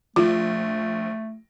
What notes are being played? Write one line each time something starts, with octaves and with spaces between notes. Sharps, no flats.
A#1 F3 A3 F4